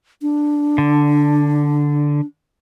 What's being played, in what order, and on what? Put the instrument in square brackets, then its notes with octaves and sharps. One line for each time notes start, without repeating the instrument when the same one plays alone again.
[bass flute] D4
[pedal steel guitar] D3